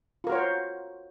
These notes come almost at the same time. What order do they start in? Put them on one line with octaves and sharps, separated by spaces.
F4 A#4 F#4 C#5 C5